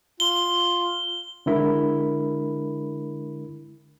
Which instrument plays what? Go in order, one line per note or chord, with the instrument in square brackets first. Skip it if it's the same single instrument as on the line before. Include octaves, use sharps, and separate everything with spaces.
[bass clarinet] F4 [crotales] G7
[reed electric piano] D3 G#3 D4 E4 A#4 B5